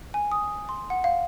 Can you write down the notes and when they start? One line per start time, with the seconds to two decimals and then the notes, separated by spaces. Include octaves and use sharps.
0.14 G#5
0.32 D#6
0.69 C6
0.90 F#5
1.04 F5